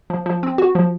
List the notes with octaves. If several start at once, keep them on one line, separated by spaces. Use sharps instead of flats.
F3
F3
C4
F#4
F3